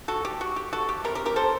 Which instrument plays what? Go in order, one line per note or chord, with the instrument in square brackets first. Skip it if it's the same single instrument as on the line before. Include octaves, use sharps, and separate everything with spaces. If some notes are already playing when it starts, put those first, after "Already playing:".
[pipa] F#4 A4
G4
F#4
G4
F#4 A4
G4
C3 G3 C4 G4 A#4
G4 A#4
G4 A#4
A4 C5